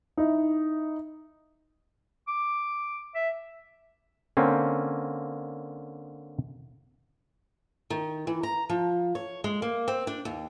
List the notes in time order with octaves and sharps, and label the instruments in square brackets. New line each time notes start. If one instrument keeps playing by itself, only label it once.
[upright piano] D#4 E4
[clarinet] D6
E5
[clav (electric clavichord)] D3 A#3 C4 C#4
[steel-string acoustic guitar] D#3
E3
A#5
F3
C#5
G#3
A#3
C4
D4
D#2